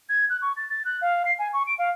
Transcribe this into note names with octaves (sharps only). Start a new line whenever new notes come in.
G#6
F#6
C#6
A6
A6
F#6
F5
C7
G#5
C#6
D7
F5